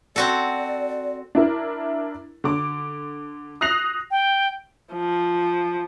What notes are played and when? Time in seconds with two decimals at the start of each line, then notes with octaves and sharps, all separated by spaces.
0.16 C4 F#4 A4 D5
1.35 D4 E4 A#4
2.44 D3 D6
3.61 D#6 F#6 A#6 C7 F7
4.11 G5
4.93 F3